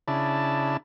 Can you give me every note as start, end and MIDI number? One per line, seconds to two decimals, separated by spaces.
0.08 0.77 49
0.08 0.77 62
0.08 0.77 64
0.08 0.77 81